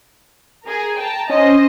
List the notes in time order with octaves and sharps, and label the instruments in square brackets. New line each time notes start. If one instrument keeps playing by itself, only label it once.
[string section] G#4 A#4
G5 A5 A#5
[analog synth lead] C#4 [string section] C5 D#5